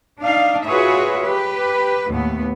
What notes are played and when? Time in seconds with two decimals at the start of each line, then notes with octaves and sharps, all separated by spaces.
0.21 D4 D#4 F5
0.66 F4 F#4 G#4 B4 C#5 E5
1.22 G4 B4
2.10 D#2 A2 B3